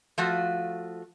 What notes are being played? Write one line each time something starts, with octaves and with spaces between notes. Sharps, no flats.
F3 A3 F4 F#4